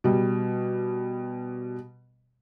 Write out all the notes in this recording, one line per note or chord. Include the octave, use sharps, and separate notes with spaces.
B2 G3